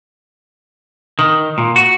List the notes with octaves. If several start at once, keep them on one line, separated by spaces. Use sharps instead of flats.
D#3
A#2
F#4